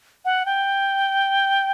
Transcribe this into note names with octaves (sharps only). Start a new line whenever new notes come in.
F#5
G5